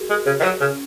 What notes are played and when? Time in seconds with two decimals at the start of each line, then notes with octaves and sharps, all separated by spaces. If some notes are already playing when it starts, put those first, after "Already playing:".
Already playing: F#4 G#4 A#4
0.10 G#3
0.26 C#3
0.40 D#3
0.43 F#3
0.60 C#3 C#4